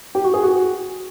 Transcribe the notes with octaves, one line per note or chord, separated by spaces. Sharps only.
G4
F#4
G#4
F#4